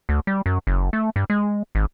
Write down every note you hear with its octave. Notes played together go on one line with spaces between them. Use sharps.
D2
G3
F#2
F#1
A3
G2
G#3
G#1